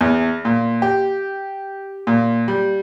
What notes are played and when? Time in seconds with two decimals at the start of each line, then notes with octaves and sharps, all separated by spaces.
0.01 E2
0.45 A#2
0.82 G4
2.07 A#2
2.48 G3